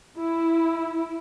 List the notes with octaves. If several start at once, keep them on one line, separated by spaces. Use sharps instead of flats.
E4